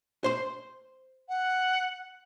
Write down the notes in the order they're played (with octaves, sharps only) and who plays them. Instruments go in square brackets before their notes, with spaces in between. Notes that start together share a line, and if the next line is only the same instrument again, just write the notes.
[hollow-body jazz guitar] C5 C6
[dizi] F#5